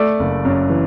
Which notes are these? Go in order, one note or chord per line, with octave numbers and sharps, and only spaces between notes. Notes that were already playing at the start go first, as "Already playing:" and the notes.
Already playing: A3 D5
F#1
F#2
E3